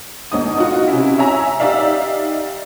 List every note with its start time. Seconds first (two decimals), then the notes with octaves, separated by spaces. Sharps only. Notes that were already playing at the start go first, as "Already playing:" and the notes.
0.32 D2 D#4 D#6
0.57 D#4 F4 F#4
0.87 C3 C#4 E4
1.18 C#5 E5 G#5 A#5
1.60 D#4 G4 D5 E5 F5